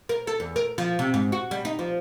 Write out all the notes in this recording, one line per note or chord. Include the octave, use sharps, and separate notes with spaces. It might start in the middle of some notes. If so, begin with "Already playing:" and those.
A#4
A4
E2
A#4
F3
C3
G#2
F#4
G3
D#4
F3